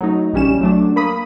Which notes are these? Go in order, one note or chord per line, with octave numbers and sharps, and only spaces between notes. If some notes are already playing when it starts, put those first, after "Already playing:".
F#3 A3 D#4
A#1 E3 G3 C#4 E7
F#3 A3 D4
A#3 B5 D#6